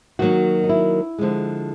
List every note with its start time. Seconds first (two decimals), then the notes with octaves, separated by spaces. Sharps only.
0.19 D#3 F#3 A#3 F#4
0.64 D#4
0.69 E4
1.18 D3 F3 G#3